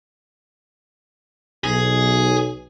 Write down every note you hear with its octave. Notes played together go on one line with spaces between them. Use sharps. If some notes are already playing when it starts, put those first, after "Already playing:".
B1 G#4